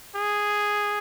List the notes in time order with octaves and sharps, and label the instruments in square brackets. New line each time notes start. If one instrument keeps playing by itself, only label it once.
[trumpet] G#4